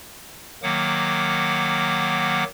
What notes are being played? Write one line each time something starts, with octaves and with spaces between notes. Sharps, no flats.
D#3 F#3 A#3 F#5 D6